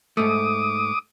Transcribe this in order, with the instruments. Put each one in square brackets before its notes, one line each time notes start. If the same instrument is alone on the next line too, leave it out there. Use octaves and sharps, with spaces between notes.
[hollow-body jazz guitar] G#2 A3 [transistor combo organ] D6 D#6